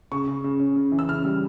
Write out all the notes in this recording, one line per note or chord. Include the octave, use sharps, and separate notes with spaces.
C#3 C#6
C#3
C#3
C#4
C#3
E3
E6
C#3 F6
G3